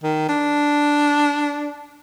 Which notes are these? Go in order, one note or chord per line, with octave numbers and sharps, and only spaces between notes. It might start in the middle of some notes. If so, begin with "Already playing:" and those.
D#3
D4